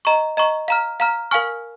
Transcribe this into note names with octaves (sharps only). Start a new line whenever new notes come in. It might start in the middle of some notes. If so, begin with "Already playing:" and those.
D#5 A#5 C#6
D#5 A#5 C#6
F5 A#5 F6
F5 A#5 F6
A#4 F5 G#5 C#6 F6